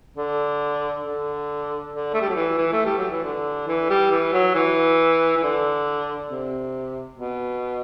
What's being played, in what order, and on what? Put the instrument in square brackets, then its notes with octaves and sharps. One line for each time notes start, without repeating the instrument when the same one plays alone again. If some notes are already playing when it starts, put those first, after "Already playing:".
[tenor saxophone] D3
D3
D3
A3
G3
F#3
E3
E3
A3
G3
F#3
E3
D3
E3
G3
E3
F#3
E3
E3
D3
C3
B2